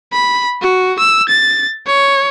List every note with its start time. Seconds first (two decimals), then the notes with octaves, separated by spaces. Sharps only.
0.13 B5
0.62 F#4
0.99 E6
1.29 A6
1.87 C#5